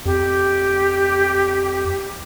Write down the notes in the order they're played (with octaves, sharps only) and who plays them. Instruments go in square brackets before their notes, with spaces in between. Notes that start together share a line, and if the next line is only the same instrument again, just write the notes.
[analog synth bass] F2 [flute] G4